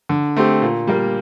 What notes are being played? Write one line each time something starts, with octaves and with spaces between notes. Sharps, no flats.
D3
A3 C4 G4
A#2
G3 A#3